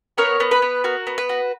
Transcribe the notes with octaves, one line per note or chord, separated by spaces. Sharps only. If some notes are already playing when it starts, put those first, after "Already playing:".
B3 A#4 C#5
B3
B4
B3
F#4 A#4
B3
B4
F#4